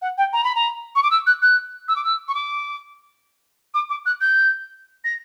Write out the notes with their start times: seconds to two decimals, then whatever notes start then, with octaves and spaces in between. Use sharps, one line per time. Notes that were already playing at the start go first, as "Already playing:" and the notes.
0.01 F#5
0.17 G5
0.33 A#5
0.44 B5
0.55 A#5
0.95 C#6
1.03 D6
1.10 E6
1.26 F#6
1.42 F#6
1.88 E6
1.96 D6
2.04 E6
2.28 C#6
2.34 D6
3.74 D6
3.89 D6
4.06 F#6
4.21 G6
5.04 A#6